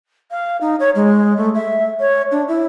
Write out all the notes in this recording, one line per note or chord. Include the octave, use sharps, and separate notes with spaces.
F5
D#4
C#5
G#3
A3
E5
C#5
D4
E4